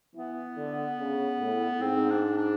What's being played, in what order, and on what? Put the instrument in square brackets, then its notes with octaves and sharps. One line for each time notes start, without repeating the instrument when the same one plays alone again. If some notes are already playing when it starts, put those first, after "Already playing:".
[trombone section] E3 [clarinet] B3
[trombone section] D3
C#3
A2
[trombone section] G#2 [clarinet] C4
[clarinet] D4
D4